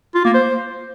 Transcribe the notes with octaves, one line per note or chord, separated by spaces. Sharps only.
F4
A#3
C5